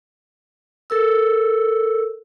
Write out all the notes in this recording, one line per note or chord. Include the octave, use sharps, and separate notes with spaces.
A4 A#4 E6